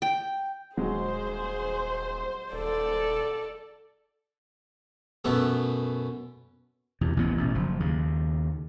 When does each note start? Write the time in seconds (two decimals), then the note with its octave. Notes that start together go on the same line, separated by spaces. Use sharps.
0.02 G5
0.77 D#1 F#3 G#3 G#4 C5
2.53 D#1 A4 D5
5.25 F#2 B2 A3 B3
7.01 E2 C3
7.17 A1 A2 B3
7.37 A1 B2
7.55 F#1 F3
7.80 D#2 C#3